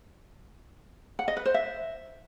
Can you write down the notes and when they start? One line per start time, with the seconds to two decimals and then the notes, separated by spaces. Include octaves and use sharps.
1.19 F#5
1.28 D#5
1.37 B4
1.46 C5
1.54 E5